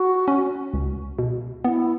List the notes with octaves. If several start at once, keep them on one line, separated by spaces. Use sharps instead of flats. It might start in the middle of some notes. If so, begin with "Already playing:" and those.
Already playing: F#4
C#4
C#2
B2
B3 E4